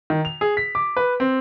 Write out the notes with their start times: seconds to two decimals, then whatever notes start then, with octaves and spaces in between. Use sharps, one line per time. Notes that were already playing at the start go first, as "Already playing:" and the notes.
0.10 D#3
0.25 F7
0.41 G#4
0.57 B6
0.75 D6
0.97 B4
1.20 C4